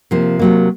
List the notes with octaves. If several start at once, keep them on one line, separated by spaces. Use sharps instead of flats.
C3 F3 A#3
C3 F#3 A#3